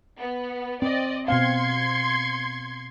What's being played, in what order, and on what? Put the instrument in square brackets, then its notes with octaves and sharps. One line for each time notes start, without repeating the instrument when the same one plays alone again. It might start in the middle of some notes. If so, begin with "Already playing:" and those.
[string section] B3
[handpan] C4 [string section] D5 D#5
[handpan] B2 C4 F5 [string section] C6 G#6 C#7